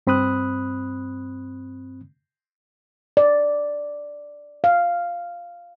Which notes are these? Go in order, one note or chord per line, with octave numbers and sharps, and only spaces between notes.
G2 C4 B5 D#6 F#6
D5
F5